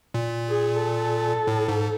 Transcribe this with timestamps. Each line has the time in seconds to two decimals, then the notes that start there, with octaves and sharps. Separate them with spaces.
0.14 A#2
0.48 G#4
0.81 A4
1.47 A2
1.68 G#2